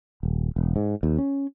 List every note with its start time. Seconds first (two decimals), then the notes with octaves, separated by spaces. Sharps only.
0.23 D#1
0.56 E1
0.76 G#2
1.03 D#2
1.18 C#4